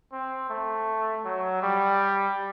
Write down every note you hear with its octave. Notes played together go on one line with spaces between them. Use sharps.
C4
A3
F#3
G3